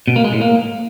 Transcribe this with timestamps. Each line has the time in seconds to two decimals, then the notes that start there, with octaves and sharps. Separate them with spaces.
0.08 B2
0.16 A#3
0.24 G#3
0.33 A2
0.41 A#3